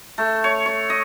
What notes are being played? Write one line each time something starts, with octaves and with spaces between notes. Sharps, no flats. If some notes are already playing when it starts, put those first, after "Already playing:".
A3
C#5
C#5
D#5